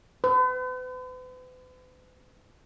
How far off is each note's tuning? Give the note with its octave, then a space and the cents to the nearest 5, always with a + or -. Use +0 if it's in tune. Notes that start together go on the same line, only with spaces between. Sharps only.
B4 +45